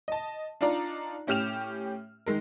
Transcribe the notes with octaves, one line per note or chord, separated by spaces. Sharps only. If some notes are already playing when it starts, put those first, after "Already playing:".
D#5 A5
D4 D#4 F4 D5 A#5
A2 C#4 G4 F6 E7 F7
D#3 G#3 A#4